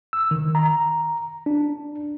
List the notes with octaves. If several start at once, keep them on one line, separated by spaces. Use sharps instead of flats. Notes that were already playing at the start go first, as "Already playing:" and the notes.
E6
D#3
A#5
D4